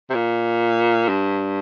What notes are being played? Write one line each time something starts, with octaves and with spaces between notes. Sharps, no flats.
C3
A#2
G2